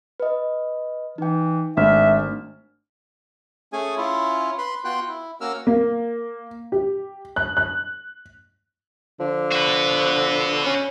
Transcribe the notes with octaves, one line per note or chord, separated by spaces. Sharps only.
B4 D#5
E3 D#4 G5
G#1 A3 D4 E5 F6
A3 C#4 G#4 G#5
C#4 E4 F4
B4 B5 C6
B3 F4 F#4 G5 C6 F#6
E4
A#3 C#4 F#4 A#4 E6 F6
A#3
G4
F#6
F#6
D3 F3
F#4 B4
C#4